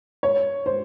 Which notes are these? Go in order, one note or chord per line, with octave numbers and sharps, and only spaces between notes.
C#5
C5